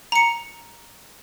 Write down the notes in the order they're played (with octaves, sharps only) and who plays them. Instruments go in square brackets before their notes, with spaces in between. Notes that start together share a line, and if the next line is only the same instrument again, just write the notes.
[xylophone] A#5 C#7